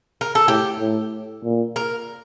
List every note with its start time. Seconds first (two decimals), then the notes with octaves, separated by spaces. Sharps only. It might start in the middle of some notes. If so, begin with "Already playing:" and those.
0.21 A#4
0.35 A4
0.48 A2 G4
0.80 A2
1.44 A#2
1.76 A#4